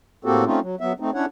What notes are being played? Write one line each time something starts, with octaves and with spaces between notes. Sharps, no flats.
A2 A#3 C4 F#4 G4 A4
A3 C4 C#4 D#4 F4
F#3
F#3 B3 E5
A3 C4 D#4
C#4 D4 E4 C#5 F#5